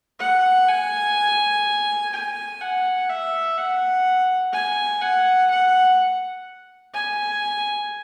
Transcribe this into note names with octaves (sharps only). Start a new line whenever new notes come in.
F#5
G#5
G#5
F#5
E5
F#5
G#5
F#5
F#5
G#5